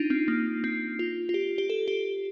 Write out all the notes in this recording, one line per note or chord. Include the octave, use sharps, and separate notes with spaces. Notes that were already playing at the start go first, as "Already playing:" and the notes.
Already playing: D4 D#4 F4
C4
A#3
C4
F4
F4
G4
G4
A4
G4